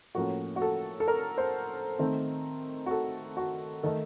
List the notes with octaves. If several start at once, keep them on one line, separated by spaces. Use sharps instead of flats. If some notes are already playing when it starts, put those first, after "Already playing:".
A2 F3 A#3 C#4 F#4
F#4
A4
A4
A#4
C5
D#3 A3 C4
F#4
A4
F#4
D#3 A3 D#4 A4